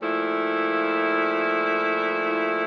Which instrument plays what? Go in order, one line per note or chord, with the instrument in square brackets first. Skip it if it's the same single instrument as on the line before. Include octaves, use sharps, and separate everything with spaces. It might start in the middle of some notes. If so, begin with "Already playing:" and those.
[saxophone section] A#2 F3 A3 E4